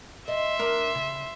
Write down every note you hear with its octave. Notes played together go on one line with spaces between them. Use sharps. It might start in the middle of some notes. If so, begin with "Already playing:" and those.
D#5 E5 C6
D4 A#4
C#3